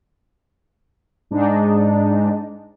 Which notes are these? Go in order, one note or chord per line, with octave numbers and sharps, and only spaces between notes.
G#2 G#3 D4 D#4